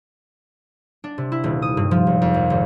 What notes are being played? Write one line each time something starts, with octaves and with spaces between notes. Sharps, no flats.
D4
C3
E4
D#1
D#6
G2
F3
G#1
F2
A#1
G#1